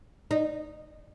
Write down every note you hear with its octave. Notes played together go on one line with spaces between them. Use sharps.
D#4